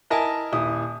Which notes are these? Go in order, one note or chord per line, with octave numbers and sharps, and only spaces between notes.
E4 A#4 D#5 E5 G#5 A5
D#1 E4 D#6